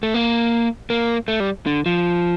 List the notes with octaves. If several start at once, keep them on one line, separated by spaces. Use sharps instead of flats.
A3
A#3
A#3
A3
G3
D3
F3